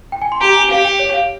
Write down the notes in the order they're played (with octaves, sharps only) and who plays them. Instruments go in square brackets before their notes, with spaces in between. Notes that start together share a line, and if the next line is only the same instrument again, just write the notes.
[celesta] G5
G#5
C6
[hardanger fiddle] G4 [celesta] A#5
[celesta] G#5
[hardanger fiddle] G4 [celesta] F5
[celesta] G5
C#5
F5